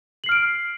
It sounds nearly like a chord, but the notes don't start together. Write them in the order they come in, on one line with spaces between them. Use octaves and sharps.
F#7 C7 F6 D7